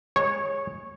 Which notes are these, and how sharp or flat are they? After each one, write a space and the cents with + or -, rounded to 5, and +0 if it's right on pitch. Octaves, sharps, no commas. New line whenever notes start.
G#3 +0 C#5 -15